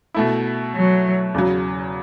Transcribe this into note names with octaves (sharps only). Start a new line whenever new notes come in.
B2 A3 E4
F#3
E2 C#3 F#3